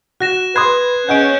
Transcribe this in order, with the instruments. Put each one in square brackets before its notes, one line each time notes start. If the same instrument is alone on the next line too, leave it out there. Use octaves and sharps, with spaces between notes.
[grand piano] F#4 [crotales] F#6 A#6 E7
[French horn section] B4 [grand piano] B5 C6 D#6 [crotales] F#6 G#6 C7
[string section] C#4 [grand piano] G#4 D#5 F#5 [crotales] G6 D7